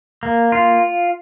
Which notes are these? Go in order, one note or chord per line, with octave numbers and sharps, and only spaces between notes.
A#3
F4